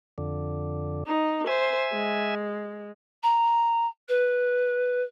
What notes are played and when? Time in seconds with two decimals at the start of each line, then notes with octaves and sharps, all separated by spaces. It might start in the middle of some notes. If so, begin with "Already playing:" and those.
0.18 F2 D3
1.06 D#4
1.47 C5 E5 G#5
1.92 G#3
3.23 A#5
4.08 B4